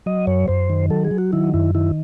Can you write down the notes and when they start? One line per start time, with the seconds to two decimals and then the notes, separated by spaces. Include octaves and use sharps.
0.06 F#3 D#5
0.27 F#2 C#5
0.48 F#2 C5
0.70 D#3
0.90 F#3 A4
1.05 G#4
1.11 F#3
1.18 F#4
1.33 D#3 E4
1.54 F#2 E4
1.75 D#3 E4